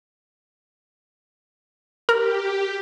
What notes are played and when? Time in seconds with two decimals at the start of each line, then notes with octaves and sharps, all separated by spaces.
2.09 G4 A#4